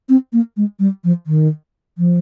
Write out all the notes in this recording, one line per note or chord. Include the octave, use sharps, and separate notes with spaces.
C4
A#3
G#3
G3
F3
D#3
F3